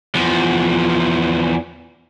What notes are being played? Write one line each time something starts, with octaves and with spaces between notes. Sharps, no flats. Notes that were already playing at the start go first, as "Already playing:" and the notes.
E2 F3